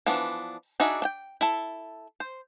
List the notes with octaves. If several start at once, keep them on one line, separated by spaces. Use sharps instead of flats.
E3 F3 B3 D4
D4 D#4 F#4 G#4 E5
D4 G5
E4 A4
C5